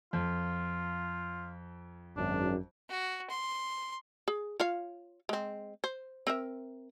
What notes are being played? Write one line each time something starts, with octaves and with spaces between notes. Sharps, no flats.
F2 F4
G#1 F#2 D4
F#4
C6
G#4
F4 C#5 F5
G#3 C4
C5
C4 A#4 E5